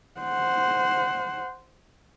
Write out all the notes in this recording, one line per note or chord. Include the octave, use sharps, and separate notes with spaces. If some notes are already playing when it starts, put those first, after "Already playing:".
C5 F#5